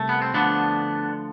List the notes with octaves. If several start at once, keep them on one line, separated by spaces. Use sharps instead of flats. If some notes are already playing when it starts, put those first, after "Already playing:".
Already playing: C2 A3
B3
C4
D2 D3 F3 B3 D4